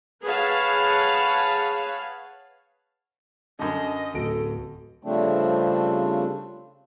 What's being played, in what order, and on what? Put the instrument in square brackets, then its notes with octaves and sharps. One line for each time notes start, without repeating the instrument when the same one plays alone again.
[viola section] G#4 B4 C#5 F5 F#5 A5
[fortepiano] F#2 D3 [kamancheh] D#5 [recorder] A5
[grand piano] D1 A5 D7 [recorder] A4
[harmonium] C#3 F3 G3 A3 C4 D4